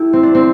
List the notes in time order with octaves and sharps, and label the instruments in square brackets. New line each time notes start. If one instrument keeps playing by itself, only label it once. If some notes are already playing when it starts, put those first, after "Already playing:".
Already playing: [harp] E4 G4 A4
C4
D4
C4